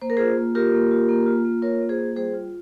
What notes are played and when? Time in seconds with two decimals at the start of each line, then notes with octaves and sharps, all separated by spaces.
0.02 A#3 C5
0.10 A#4
0.17 F4 G#4 C5
0.37 A#3
0.55 F4 G4 A#4
0.73 A#3
0.91 F4
1.09 A#3
1.26 F4
1.45 A#3
1.62 F4 A#4 C#5
1.81 A#3
1.89 G#4 C5
1.99 F4
2.16 G3 G#4 C5
2.34 F4